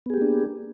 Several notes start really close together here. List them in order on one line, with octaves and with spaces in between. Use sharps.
B3 G#4 G4 A#3 D4